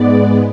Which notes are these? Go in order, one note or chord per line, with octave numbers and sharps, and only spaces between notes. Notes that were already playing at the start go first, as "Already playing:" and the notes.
Already playing: G#2 G#3 B3 D5